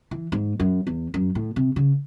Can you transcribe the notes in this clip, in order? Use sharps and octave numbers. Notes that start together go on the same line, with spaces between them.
E3
G#2
F#2
E2
F#2
A2
C3
C#3